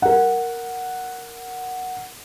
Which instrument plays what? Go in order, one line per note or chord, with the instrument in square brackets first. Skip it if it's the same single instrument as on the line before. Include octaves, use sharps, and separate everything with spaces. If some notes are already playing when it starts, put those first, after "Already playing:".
[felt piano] A#4 F#5